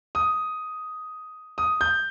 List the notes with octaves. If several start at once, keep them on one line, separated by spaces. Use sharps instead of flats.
D#6
D#6
G6